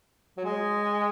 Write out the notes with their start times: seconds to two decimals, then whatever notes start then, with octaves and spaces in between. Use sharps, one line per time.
0.38 F#3
0.45 G#3